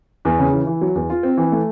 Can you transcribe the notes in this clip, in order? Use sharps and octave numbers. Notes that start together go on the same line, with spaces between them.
E2
C#3
E3
E3
F#3
E2
F4
C4
E3
A3